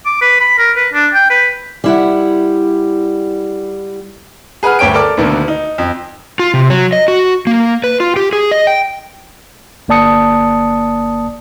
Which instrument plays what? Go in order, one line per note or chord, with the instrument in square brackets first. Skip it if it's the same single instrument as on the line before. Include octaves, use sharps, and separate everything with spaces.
[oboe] D6
B4
B5
A#4
B4
D4
G5
B4
[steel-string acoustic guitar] G3 E4 F#5
[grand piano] G#4 B4 F#5 B5 F6
D2 G2 C#5 G5 D7
A4 A#4 D5 D6
D2 B2 D3 D#3 A#3 B3
D#4
F2
[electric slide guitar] F4
C3
F#3
D#5
F#4
A#3
B4
F4
G4
G#4
D#5
G5
[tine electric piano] G1 A#3 D5 A5 D#6 C#7